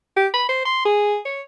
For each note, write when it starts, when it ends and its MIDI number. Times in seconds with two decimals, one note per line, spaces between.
0.17 0.28 67
0.34 0.48 83
0.49 0.62 72
0.66 0.82 84
0.85 1.18 68
1.25 1.42 73